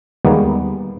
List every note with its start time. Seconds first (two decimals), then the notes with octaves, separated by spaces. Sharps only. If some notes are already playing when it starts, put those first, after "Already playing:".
0.25 D#2 G3 G#3 A#3 B3